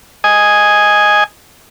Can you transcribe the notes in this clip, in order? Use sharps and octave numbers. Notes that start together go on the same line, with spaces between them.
D#5 G#5